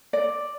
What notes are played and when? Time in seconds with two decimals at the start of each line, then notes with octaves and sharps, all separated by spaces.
0.13 D5